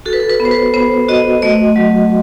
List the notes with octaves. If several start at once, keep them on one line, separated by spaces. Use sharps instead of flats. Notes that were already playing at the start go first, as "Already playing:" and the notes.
F#4 A4
B4
A4
B4
B3
C5
B4
B3 C5
F#4 D#5
A3 D#5
F#3